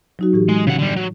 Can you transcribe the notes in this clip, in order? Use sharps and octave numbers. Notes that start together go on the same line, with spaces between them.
F#3 D#4 F#4
A2 E3 G4
G#3
C#3 F#5
D3 G3
F#3